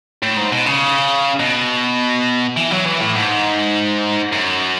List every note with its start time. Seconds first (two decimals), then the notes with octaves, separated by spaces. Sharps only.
0.22 A2
0.37 G#2
0.52 B2
0.66 C#3
1.39 B2
2.57 E3
2.71 F#3
2.85 E3
3.01 A2
3.15 G#2
4.32 F#2